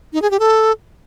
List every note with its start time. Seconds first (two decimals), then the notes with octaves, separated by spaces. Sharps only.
0.13 D#4
0.22 G#4
0.31 G4
0.40 A4